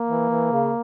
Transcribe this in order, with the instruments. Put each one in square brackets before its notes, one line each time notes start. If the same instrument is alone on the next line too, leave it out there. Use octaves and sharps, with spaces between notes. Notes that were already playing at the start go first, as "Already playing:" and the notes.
Already playing: [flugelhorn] A#3
[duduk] E3
E3
C#3